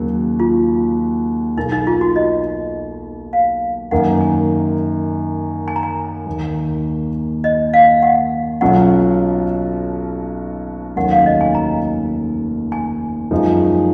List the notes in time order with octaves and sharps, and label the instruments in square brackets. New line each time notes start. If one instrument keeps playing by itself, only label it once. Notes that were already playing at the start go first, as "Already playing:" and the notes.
Already playing: [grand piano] D#2 C#3 F#3
[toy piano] F4
[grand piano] B1 B2 A#3 [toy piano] D#4
[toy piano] D#4
F4
F#4
D#5
F5
[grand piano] F#2 D#3 A#3 [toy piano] F#5
[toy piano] G#5
G#5
A#5
G#5
[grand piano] D#2 D#3 A#3
[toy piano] D#5
F5
F#5
[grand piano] B1 B2 F#3 C#4 F4 [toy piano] F#5
[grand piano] F1 D#2 D#3 F#3 C#4 [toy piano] F#5
[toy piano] F5
D#5
G#5
A#5
G#5
[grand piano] F#2 F3 G#3 D#4